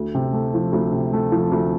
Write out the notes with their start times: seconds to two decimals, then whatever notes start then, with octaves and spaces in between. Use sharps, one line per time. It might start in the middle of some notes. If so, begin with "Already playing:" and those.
Already playing: D2
0.14 C3
0.33 A3
0.54 F3
0.72 D2
0.93 C3
1.13 A3
1.32 F3
1.52 D2